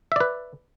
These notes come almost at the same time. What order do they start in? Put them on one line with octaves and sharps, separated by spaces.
E5 D5 B4